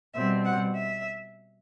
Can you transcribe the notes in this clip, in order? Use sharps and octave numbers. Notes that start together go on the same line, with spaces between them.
B2 G3 C4 E5
F#5
E5